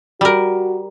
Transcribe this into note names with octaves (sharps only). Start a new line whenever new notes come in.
G3 F#4 A#4